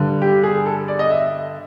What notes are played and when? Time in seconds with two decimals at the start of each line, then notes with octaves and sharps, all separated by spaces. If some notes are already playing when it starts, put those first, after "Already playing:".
Already playing: G2 D3 G3
0.22 G4
0.43 G#4
0.66 A4
0.88 D5
0.99 D#5
1.10 E5